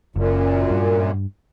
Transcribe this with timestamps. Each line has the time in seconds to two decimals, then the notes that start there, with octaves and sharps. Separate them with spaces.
0.16 F#1 F#2 A#2
0.70 G2